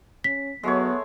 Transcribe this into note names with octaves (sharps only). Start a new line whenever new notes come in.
C#4 B6
F#3 G#3 A3 B3 C#5